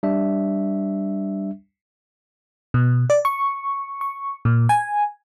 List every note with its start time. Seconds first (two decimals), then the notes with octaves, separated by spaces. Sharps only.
0.03 G3 D4 E5
2.74 B2
3.10 D5
3.25 C#6
4.01 C#6
4.45 A#2
4.69 G#5